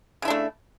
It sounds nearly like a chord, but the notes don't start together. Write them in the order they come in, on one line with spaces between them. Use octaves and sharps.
C#3 E4 D4 A3